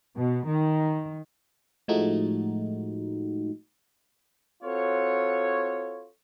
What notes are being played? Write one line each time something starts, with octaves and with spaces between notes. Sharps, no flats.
B2
D#3
A2 F3 G#3 A3 D#4 F#4
C4 F4 F#4 A4 C#5